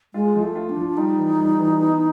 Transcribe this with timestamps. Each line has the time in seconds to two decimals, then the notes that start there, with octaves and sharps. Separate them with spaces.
0.14 G#3 F4
0.35 F3
0.43 A3
0.55 F4
0.69 D4
0.76 F3
0.97 G3 D#4
1.17 E3
1.38 G3
1.59 E3
1.80 B3